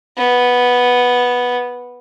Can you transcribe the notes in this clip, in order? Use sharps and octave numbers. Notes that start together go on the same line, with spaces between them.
B3